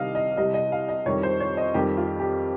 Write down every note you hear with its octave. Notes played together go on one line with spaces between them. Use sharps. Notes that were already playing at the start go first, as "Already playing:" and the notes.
Already playing: C2 C3 D#3 G3 D#5 F5
D#5
C2 C3 G3 D#5
D#5
F5
D#5
F2 D#3 G3 C#5
C5
C#5
D#5
F2 D#3 G3 G4
F4
G4